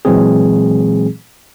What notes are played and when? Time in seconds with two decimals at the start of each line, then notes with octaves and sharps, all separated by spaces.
0.05 A#2 E3 F#3 G#3 C4 G#4